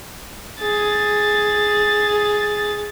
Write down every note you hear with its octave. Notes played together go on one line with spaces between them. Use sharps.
G#4 A6